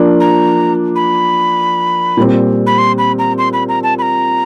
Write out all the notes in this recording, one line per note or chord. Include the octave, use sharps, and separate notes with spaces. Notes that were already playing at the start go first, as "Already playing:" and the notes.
Already playing: F3 A#3 D4
A#5
B5
A#2 G3 C4
B5
C6
B5
A#5
C6
B5
A#5
A5
B5
A#5